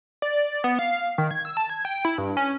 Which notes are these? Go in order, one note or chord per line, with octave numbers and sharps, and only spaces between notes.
D5
B3
F5
D#3
G#6
E6
A5
G#6
G5
E4
G2
C#4